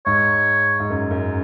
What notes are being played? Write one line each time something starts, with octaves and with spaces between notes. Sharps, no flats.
G#2 C#5
G#2
F#2
F#2